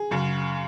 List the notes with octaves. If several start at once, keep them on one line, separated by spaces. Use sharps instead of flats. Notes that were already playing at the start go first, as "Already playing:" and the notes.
Already playing: G#4
F#2 C#3